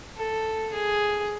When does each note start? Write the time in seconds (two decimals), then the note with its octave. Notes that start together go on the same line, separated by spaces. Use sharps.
0.17 A4
0.73 G#4